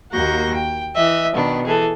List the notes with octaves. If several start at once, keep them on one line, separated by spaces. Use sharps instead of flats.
D#2 A#3 F#4 G6 A#6
G5
E3 D#5 E5
B2 D#3 B3 D4
E3 G#4 A4